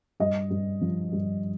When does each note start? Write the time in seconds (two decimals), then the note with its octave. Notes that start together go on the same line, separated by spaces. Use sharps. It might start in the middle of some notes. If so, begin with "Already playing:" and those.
0.20 G2 D#5
0.51 G2
0.81 F3
1.13 G2